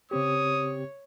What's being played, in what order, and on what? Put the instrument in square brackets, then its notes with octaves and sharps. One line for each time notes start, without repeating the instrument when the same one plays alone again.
[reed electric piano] C#3 C4 G4 [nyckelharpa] C#5 [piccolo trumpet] D#6